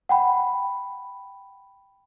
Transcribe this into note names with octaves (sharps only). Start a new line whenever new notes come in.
F#5 G5 B5